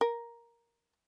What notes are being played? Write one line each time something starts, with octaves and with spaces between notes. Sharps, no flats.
A#4